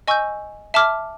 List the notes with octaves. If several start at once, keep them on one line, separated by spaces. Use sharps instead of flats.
D#5 G#5 C#6 E6 G6
E5 A5 D6 F6